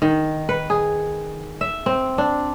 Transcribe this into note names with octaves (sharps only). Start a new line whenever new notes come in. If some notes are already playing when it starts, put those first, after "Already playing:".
D#3
B4
G#4
E5
C4
D4